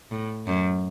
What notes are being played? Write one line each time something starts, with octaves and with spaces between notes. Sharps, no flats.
A2
F#2